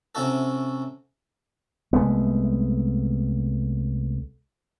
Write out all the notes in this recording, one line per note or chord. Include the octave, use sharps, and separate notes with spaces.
C3 C#4 E4 F#4 A4
C2 G#3 A3 B3